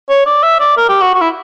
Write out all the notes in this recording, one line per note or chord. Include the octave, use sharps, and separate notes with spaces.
C#5
D5
E5
D5
A#4
G4
F#4
F#4
E4